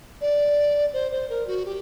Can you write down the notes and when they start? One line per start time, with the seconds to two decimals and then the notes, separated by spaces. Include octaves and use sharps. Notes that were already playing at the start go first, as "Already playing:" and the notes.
0.21 D5
0.93 C5
1.12 C5
1.30 A#4
1.47 F#4
1.66 G4